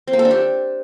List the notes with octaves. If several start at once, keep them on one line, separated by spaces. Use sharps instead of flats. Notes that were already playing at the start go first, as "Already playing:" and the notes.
C4
A#3
A4
D4
G4